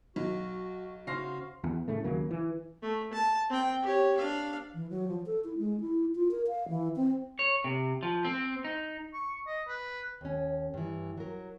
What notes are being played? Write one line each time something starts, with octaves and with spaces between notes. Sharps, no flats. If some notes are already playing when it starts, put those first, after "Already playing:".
B1 F#4
C#3 F#4 C5 F5 F6 A#6 C7
E2
A2 C#3 A3
D#2 C#3 F#3 A#3
E3
A3
A5
C4 G5
G4 C#5
D4 F5
E3
F#3
F3
A4
E4
G#3
E4
F4
A#4
F5
E3
C4
C#5
C3
F3
C4
D#4
C#6
D#5
B4
D#2 C#4
G2 E3
F#3 A#4